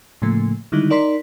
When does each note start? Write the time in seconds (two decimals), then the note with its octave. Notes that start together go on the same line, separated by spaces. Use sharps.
0.22 A2 C#3 F3 A3 A#3
0.72 D3 D#3 G3 G#3 D#4 E4
0.90 D#4 A#4 D5 A#5 C6 B6